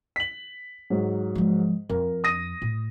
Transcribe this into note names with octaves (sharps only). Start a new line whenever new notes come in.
B6 F#7
G#2 F#3
F3 G#3
F2 A#4
D#6 A#6 D#7
A2